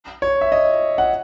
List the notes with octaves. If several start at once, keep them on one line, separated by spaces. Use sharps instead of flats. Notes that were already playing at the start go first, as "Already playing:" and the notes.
C#5
E5
D#5
F#5